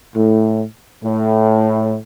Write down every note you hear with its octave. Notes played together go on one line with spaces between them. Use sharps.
A2
A2